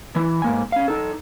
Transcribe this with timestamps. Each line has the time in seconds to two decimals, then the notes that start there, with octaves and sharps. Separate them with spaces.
0.16 E3 E4
0.42 G#2 A#3 G#5
0.72 C#4 F5
0.88 D#4 A4